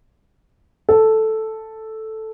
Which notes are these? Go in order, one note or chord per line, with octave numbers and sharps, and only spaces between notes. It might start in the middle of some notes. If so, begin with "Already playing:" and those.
A4